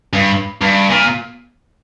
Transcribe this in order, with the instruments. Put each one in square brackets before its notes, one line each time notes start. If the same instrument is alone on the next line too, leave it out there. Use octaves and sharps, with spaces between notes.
[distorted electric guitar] G2
G2
A#2